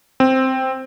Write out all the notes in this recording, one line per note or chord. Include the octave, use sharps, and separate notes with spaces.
C4